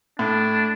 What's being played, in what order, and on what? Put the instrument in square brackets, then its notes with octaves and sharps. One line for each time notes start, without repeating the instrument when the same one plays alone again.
[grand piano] A2 [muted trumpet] D4